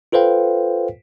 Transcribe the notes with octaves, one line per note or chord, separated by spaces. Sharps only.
F4 A4 B4 C5 F5 G5